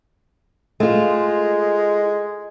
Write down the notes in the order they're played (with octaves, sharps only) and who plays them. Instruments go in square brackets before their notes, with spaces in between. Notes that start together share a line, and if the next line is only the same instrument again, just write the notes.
[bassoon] G#3 [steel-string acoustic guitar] A3 F4